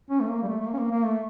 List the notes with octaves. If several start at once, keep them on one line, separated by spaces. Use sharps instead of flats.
C#4
A3
A#3
G3
A3
A3
A#3
C#4
A#3
A#3
A3